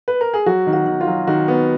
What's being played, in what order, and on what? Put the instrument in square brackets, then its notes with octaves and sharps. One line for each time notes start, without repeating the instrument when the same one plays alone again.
[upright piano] B4
A#4
G#4
F#3 F#4
D#3
F#4
D#3
F4
F#3
D#3 F#4
B3